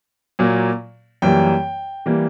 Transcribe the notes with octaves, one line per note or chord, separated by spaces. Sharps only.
A#2 F#3 A#3
F#2 E3 G3 A#3 G5
E3 G3 A#3